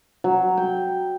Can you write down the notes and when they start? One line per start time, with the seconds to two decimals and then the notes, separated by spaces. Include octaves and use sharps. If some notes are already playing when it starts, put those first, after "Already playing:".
0.24 F#3
0.57 G5